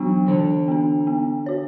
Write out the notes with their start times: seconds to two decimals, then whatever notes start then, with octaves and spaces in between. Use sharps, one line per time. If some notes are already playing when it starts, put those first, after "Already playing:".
Already playing: E3 F#3 B3 D4
0.28 D3 E3
0.68 B3 D4
1.07 B3
1.46 F#4 C#5